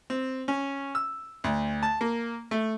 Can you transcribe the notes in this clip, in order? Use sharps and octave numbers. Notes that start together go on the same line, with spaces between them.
C4
C#4
E6
D2
A5
A#3
A3